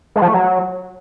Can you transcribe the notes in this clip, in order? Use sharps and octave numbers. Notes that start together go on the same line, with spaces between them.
G#3
F3
A3
F#3